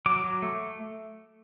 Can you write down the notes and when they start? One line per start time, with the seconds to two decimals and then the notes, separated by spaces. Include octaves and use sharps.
0.06 F#3 D6
0.24 F#3
0.42 A3